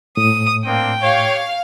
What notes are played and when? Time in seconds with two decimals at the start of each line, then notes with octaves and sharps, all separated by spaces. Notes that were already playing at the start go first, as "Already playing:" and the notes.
0.17 A2 D#6
0.65 A#3 C4 D4 G5
1.01 G4 C#5 F5